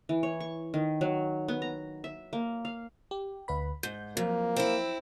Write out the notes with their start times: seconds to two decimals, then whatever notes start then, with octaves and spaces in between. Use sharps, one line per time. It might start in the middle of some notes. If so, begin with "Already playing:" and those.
0.09 E3
0.23 C#5
0.40 C#6
0.74 D#3
1.01 F#3
1.48 B3
1.62 A#5
2.04 E5
2.33 A#3
2.65 F5
3.11 G4
3.48 D2 B4 B5
3.83 G#2 G6
4.17 F2 F3 F#3 A#3
4.56 C4 E4